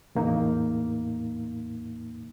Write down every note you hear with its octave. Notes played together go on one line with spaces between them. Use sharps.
E2 A2 A#3 D#4